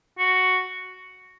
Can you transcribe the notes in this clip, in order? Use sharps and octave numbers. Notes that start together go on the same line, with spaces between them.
F#4